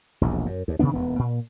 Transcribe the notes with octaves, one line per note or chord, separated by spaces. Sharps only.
E1 A#1 D#2
F#2
D#2
C3 D#3 B3 D4
E1 D#2 B3
A#2